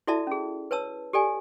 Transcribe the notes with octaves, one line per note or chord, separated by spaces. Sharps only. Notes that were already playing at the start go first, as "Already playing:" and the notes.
E4 F#4 A4 D5 E5 A5
C#4 G#4
B4 C#5 A5 E6
G4 A4 D5 G#5